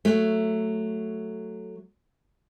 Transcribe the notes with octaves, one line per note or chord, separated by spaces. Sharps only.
F#3 A3